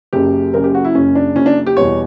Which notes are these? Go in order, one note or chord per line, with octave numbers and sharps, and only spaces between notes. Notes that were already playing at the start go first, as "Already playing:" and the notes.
F#1 F#2 C#3 G4
F#1 F#2 C#3 A#4
G4
F#4
E4
F#1 F#2 C#3 C#4
D4
F#1 F#2 C#3 C#4
D4
G4
E2 B2 G3 B3 C#5